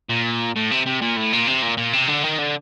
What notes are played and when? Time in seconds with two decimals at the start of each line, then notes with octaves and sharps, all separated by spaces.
0.09 A#2
0.56 A2
0.71 C3
0.86 C3
1.01 A#2
1.16 A2
1.33 A#2
1.47 C3
1.62 A#2
1.77 A#2
1.93 C3
2.08 D3
2.23 D#3
2.39 D3